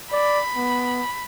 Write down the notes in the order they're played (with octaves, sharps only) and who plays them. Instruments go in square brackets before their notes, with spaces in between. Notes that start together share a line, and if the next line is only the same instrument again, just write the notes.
[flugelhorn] D5 [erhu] B5
[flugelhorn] B3